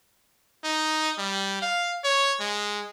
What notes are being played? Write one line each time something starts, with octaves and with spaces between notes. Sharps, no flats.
D#4
G3
F5
C#5
G#3